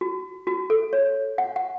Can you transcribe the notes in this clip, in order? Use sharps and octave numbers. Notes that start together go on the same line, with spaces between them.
F#4
F#4
A4
C#5
F#5
F#5